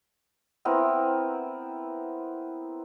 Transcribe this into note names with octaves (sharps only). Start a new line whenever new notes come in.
B3 C4 E4 A#4